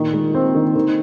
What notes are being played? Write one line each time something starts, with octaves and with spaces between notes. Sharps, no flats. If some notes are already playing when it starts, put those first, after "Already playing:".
Already playing: A#2 D#3
G#3
C4
D#3
D#3